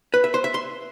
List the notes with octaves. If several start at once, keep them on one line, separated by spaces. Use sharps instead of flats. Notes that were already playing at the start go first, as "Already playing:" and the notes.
B4
E5
C5
E5
C6